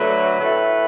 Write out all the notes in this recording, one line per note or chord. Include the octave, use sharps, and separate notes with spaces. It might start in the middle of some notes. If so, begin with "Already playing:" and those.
Already playing: D3 F#3 A3 B4
A2 A3